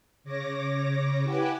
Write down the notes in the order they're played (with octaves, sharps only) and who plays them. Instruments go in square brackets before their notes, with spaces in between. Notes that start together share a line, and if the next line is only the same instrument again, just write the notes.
[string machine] C#3 C#5 D6 A#6
E4 G4 B4 F#5 G#5 D6